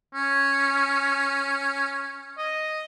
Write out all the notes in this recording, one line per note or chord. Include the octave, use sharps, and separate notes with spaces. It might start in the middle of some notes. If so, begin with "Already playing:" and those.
C#4
D#5